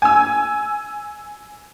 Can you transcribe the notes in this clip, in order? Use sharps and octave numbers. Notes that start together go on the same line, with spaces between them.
G#5 E6